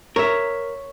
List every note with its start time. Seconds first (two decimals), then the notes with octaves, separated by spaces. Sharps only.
0.16 A#4 C#5 E5